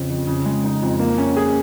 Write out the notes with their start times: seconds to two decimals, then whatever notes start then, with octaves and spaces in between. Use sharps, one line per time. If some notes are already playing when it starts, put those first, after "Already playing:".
Already playing: F2 C#3 F3
0.10 F2
0.27 C#3
0.45 G#3
0.64 D#4
0.82 F2
0.99 A#3
1.18 C#4
1.37 G#4